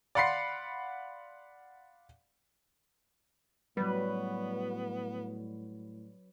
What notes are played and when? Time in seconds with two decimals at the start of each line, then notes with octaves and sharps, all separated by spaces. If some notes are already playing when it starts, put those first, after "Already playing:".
0.15 D5 F5 F#5 B5 C6 C7
3.77 A2 F#3 G3 B3 B4